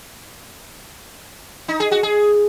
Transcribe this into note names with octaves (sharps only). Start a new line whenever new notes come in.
D#4
G#4
F#4
G#4